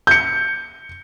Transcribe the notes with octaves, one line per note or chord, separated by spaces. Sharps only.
G6 C#7